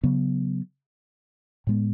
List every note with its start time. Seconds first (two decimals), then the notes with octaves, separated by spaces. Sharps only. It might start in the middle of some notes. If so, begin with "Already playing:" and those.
0.03 C#3 F#3 B3
1.67 A2 G#3 B3